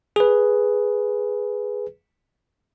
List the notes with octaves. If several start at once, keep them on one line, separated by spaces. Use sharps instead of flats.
G#4 B4